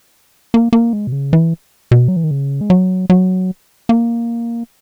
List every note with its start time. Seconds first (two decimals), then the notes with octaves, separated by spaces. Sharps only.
0.54 A#3
0.73 A#3
0.93 G#3
1.07 B2
1.12 C#3
1.33 E3
1.91 B2
2.08 F#3
2.17 E3
2.24 D#3
2.31 C#3
2.61 G#3
2.70 F#3
3.10 F#3
3.89 A#3